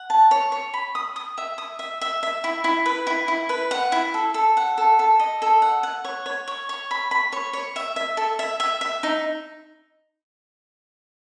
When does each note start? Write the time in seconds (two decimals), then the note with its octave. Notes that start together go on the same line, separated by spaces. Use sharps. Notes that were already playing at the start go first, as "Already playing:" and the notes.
Already playing: F#5
0.10 A5
0.31 C#5
0.52 C#5
0.74 B5
0.95 D#6
1.16 D#6
1.38 E5
1.58 D#6
1.79 E5
2.01 E5
2.23 E5
2.44 E4
2.64 E4
2.86 B4
3.07 E4
3.28 E4
3.49 B4
3.71 F#5
3.92 E4
4.14 A4
4.34 A4
4.57 F#5
4.78 A4
4.99 A4
5.19 D#5
5.42 A4
5.62 F#5
5.83 F#5
6.05 C#5
6.26 C#5
6.48 C#5
6.69 C#5
6.91 B5
7.11 B5
7.33 C#5
7.53 C#5
7.76 E5
7.96 E5
8.17 A4
8.39 E5
8.60 E5
8.81 E5
9.03 D#4